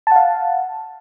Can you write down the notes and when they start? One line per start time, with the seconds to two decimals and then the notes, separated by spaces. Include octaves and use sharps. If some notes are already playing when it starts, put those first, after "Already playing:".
0.07 A5
0.12 F#5
0.16 F5